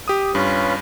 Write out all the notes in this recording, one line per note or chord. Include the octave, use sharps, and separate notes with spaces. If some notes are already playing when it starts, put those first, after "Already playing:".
G4 D#6
G2 C#4 F4 B4